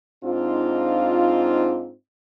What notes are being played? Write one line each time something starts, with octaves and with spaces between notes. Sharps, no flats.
G#2 C4 D4 D#4 F4